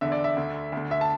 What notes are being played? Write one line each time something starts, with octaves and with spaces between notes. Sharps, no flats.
E2 D3 E5
D5
E5
D2 D3
D2 D3
E5
A5